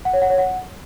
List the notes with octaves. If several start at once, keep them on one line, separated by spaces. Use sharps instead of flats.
F#5
C#5
F#5
C#5
F#5